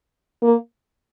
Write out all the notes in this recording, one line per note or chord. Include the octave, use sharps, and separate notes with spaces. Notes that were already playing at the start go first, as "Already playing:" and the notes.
A#3